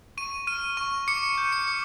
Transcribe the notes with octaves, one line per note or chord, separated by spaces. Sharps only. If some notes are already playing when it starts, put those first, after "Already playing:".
C#6 D#7
F6 D#7
C#6 D#7
D6 C#7
G6
C#7
D6